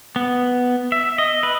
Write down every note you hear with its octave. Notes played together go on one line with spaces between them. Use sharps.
B3
E5
D#5
B4